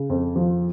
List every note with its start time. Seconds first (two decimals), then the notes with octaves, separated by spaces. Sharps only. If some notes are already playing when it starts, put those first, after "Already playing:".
Already playing: C#3
0.10 F2
0.36 F3